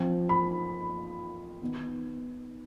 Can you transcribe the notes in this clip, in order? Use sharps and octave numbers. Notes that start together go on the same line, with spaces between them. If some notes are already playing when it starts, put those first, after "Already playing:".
Already playing: F3 C4 F4
B5
D#3 B3 D#4